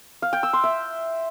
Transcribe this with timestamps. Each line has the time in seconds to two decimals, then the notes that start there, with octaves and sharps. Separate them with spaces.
0.22 F5
0.33 G5
0.43 E6
0.53 C6
0.64 E5